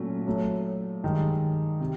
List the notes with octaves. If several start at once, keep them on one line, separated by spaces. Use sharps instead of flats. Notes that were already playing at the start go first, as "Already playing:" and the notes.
Already playing: A#2 F#3 A3 C#4 F#4
A2 F#3 A3
G2 D#3 G#3
C3